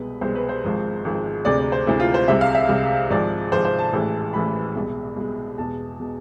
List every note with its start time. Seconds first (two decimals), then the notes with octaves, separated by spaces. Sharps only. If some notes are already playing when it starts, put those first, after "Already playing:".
Already playing: C2 B2 G#3 B4
0.21 C2 B2 G#3 C5
0.35 B4
0.49 C5
0.62 G#1 G#2 F3 G#3
1.05 G#1 G#2 F3 G#3
1.45 D2 C3 G#3 D5
1.59 D5
1.72 C5
1.86 D2 C3 G#3 E4
2.00 F4
2.14 C5
2.28 C2 C3 G#3 E5
2.41 F5
2.55 E5
2.69 C2 C3 G#3
3.10 G#1 G#2 F3 G#3 D5
3.52 G#1 G#2 F3 G#3 C5
3.65 C5
3.79 A5
3.93 A1 A2 E3 G#3
4.33 A1 A2 E3 G#3 B5
4.75 C2 B2 G#3
5.16 C2 B2 G#3
5.58 E2 B2 G#3 A5
6.00 B2 G#3